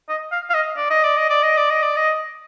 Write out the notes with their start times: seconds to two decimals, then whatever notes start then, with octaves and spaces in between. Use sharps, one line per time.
0.09 D#5
0.32 F5
0.50 F5
0.54 D#5
0.77 D5
0.90 D#5
1.04 D5
1.17 D#5
1.30 D5
1.43 D#5
1.57 D5
1.70 D#5
1.83 D5
1.96 D#5